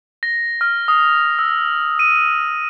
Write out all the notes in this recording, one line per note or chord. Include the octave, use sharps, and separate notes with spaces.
A#6
F6
D#6
E6
D#7